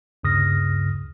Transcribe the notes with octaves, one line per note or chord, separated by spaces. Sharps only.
D2 G2 C#3 D#6 F6 A#6